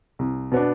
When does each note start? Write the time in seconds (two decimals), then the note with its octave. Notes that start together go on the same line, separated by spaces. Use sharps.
0.19 C2
0.52 B2 B3 D4